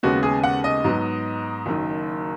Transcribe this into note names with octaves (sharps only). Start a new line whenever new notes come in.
D#2 C#3 G#3 B3 F#4
G#4
F#5
D#5
G#2 F#3 B3
F#1 F#2 D#3